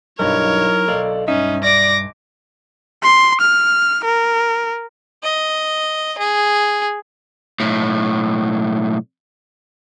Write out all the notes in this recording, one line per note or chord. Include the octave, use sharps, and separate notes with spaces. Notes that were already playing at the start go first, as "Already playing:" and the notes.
B1 G2 F#3 D#4 E4 A#4 C#5
B1 A4 D5 F5
G2 C#4 D#4 E5
D5 D6 A#6
C6
F6
A#4
D#5
G#4
B1 A2